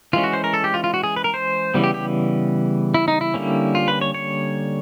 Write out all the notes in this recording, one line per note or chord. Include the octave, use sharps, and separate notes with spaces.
E3 G#3 C#4 F4
F#4
C5
A#4
A4
G4
F4
F4
F#4
G#4
B4
A#4
C5
C#3 E3 G3 B3
G4
G4
E4
D#4
E4
D3 G3 A#3 C#4
F4
B4
C#5
C#5